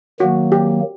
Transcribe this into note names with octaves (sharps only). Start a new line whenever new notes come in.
D#3 F#3 A#3 F#4
G4